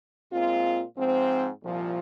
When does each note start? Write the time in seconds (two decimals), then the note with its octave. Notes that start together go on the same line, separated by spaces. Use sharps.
0.32 A#2 G#3 C4 F4
0.97 G#2 F3 C4
1.63 C2 A#2 F3